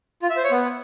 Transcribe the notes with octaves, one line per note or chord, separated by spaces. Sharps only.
F4
E5
C5
C#5
B3